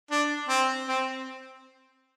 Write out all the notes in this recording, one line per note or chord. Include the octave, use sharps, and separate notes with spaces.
D4
C4
C4